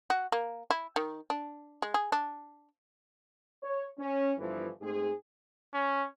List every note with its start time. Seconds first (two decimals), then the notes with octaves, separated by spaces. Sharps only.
0.10 F#4
0.32 A#3
0.70 E4
0.96 D#3
1.30 D4
1.82 G#3
1.94 G#4
2.12 D4
3.63 C#5
3.98 C#4
4.38 G1 E3 F3
4.81 G#2 A3 C4 G#4
5.74 C#4